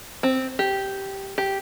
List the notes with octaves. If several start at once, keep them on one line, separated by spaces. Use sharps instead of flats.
C4
G4
G4